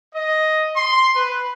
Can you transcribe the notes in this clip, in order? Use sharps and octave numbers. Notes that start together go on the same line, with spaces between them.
D#5
C6
B4